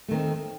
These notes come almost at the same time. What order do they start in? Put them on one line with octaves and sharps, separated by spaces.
A3 D#3 C4